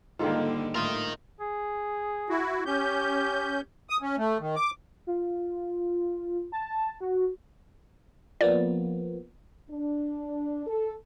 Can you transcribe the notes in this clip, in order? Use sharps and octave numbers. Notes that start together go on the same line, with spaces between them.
G#2 D3 D#3 G3 A#3 F4 A4 F5
A2 F4 A#4 D#5
G#4
E4 F#4
C#4 G4 G6
D#6
C#4
A3
D#3
D6
F4
A5
F#4
F3 A#3 B3 D5
D4
A4